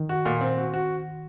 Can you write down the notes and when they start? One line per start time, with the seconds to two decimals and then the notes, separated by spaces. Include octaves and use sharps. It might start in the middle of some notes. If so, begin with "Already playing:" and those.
Already playing: D#3
0.09 F#4
0.25 A#2
0.41 C4
0.58 F#4
0.74 F#4